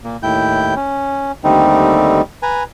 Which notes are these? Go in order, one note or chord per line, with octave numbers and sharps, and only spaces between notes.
A#2 A#3
D#2 A2 E4 G5 G6
C#4
D#2 D3 G3 A3 C4 D#4
B4 G#5 A#5